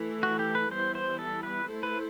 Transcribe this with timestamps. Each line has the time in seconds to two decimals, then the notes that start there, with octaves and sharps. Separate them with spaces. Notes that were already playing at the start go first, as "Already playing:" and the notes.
Already playing: E3 A3 E4 A4
0.23 F#4
0.39 G4
0.55 B4
0.71 E3 G3 B3 E4 C5
0.95 C5
1.19 A4
1.43 B4
1.67 A3 E4 A4 C5
1.83 B4